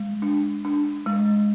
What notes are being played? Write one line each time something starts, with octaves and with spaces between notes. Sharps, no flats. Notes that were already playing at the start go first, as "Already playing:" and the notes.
Already playing: G#3
D4
D4
G#3